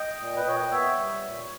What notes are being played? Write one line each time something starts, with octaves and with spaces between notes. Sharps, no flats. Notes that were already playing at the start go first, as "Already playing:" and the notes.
Already playing: D#5 G5
A#2
B4
A#2 C#5
D#5
B3 C#5 E5
G3
A#2